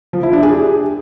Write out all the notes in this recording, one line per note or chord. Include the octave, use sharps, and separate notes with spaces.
F3
E4
D4
G#4
G4